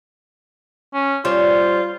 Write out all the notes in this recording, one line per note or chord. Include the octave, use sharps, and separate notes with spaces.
C#4
G3 F4 C5 C#5